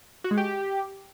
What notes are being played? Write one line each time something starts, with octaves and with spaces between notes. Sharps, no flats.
F#4
G#3
G4